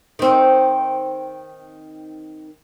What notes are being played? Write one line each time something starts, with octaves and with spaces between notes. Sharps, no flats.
D#3 C4